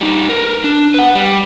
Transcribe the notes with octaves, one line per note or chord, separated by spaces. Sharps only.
G3 D#4
A#4 B4
D4
B4 F#5
G3